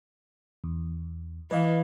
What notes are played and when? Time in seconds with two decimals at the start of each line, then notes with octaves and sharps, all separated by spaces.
0.64 E2
1.51 E3 B4 D#5 F5